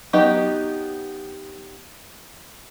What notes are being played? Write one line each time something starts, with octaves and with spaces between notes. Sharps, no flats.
F#3 B3 D#4 G4 D#5